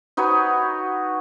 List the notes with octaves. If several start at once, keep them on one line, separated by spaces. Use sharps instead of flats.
D#4 F#4 B4 C#5